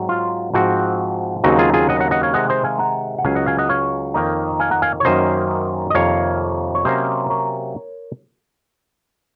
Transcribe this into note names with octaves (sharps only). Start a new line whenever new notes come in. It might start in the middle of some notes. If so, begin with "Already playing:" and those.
Already playing: G#2 F#3 C4
F4
G#2 F3 C4 F#4
D#2 C#3 F#3 C4 D#4 F#4
F4 G#4
F4 G#4
D#5 F#5
F#5 A#5
D#5 F#5
C#5 F5
C3 D#3 G#3 D#5 F#5
C5 D#5
F5 G#5
F#5 A#5
F#5
C#2 C#3 F#3 C#4 F5 G#5
D#5 F#5
F5 G#5
D#5 F#5
C#5 F5
F2 D#3 A#3 D#4
F5 G#5
F#5 A#5
F5 G#5
C#5
F#2 D#3 A#3 C#4 C5 D#5
D#5
F2 C3 D#3 A#3 C#5 F5
C#5
C3 F#3 A#3 C#4 C5 D#5
A#4 C#5